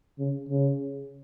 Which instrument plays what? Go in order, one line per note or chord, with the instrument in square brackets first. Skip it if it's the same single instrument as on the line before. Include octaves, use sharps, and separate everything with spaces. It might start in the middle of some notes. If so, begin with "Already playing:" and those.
[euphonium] C#3
C#3